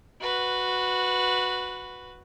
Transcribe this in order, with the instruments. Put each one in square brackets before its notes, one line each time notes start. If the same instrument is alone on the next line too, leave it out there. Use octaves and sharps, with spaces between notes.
[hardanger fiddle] F#4 B4